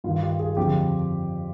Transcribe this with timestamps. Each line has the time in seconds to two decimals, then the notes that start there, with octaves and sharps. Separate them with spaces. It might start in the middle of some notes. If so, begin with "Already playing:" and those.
0.04 G2 D#3 F4
0.22 G4
0.39 G#4
0.57 F2 D3 F3 G4